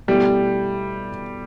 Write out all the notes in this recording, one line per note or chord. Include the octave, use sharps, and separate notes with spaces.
B2 G3 A3 E4 G4